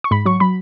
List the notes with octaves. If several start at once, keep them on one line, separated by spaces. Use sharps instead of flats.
C#6
G#2 B5
F#3 C#6
F#3 B5